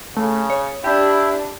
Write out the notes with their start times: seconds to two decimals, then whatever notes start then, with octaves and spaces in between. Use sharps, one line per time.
0.17 C#3 A3
0.50 C#5
0.84 D4 E4 G4